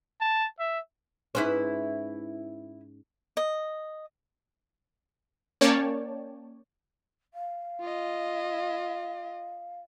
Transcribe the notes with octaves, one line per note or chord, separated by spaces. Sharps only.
A5
E5
G#2 C#4 E4 B4 C5
D#5
A#3 C#4 C#5 D5 G5 A5
F5
F4 D#5